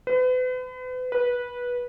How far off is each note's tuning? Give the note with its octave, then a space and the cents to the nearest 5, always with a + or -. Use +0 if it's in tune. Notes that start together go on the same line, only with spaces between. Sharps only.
B4 +40
B4 -15